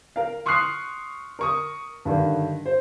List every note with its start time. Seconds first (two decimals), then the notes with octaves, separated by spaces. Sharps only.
0.16 A#4 F5
0.46 C6 C#6 D#6 F6 F#6 C7
1.39 A#4 C#6 D#6
2.05 G2 D3 D#3
2.66 C5